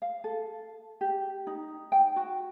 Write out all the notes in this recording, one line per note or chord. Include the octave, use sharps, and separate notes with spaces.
F5
A4
G4
D#4
G5
F#4